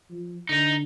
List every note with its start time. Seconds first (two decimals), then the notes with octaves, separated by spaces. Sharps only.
0.10 F3
0.49 D3 D#4